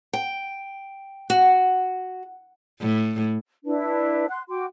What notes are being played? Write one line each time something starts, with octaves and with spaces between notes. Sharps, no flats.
G5
F#4
A2
D4 E4 B4
F#5 C6 F#6
F#4 G5 C6 D6